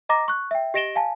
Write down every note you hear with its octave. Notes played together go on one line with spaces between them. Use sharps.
D#5 A#5 D6 A#6
C#6 F#6
E5 G5
G4 D#5 A#6 D7 E7 G7
F5 G#5 A5